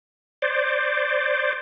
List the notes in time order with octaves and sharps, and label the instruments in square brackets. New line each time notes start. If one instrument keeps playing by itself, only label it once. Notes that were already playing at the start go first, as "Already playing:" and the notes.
[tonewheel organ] C5 D5